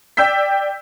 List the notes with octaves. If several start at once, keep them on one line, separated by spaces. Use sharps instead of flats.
D5 G5 E6 G6 B6